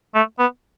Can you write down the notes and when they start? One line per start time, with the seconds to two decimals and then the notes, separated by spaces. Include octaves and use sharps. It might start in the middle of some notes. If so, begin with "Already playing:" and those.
0.15 A3
0.39 B3